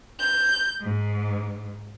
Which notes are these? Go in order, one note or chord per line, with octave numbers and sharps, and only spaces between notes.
G6
G#2